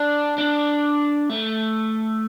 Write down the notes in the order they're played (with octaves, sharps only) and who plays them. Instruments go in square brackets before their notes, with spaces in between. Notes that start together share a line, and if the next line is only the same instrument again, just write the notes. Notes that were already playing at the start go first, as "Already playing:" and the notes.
Already playing: [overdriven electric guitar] D4
D4
A3